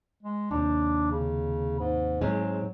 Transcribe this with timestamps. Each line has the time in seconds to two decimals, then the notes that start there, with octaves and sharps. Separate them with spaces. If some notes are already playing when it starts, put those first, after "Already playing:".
0.23 G#3
0.51 D#2 C3 D4
1.11 C#3
1.80 G#2
2.21 G#2 F#3 G#3 C4